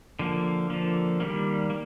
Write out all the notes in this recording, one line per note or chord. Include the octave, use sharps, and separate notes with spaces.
D3 F3 A#3
D3 F3 A#3
D#3 G3 A#3
A#3